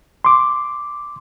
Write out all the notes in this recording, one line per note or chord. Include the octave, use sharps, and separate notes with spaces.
C6 D6